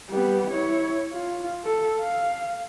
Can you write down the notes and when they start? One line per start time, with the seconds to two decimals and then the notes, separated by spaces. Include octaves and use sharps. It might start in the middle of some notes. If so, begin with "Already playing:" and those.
0.10 G3 B3
0.50 E4 C#5
1.13 F4
1.65 A4
2.00 F5